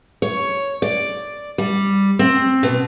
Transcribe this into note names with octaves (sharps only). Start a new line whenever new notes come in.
C#5
D5
G3
C4
B2